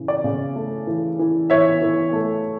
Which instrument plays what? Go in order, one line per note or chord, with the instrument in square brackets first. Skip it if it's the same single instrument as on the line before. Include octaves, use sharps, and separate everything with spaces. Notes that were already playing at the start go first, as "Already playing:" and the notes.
Already playing: [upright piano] C#3 E3
D5
C#3
A3
E3
E3
E3 C#5 E5
E3
A3